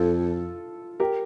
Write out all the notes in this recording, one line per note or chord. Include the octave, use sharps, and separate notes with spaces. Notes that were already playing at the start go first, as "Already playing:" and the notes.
Already playing: F2 F4 A4
G4 A#4